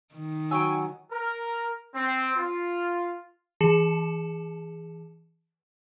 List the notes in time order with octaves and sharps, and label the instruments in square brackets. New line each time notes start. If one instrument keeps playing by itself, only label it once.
[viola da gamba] D#3
[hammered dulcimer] F#3 [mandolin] G5 C#6 E6 [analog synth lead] G#5
[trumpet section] A#4
C4
F4
[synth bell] E3 G#4 A5 C#7 E7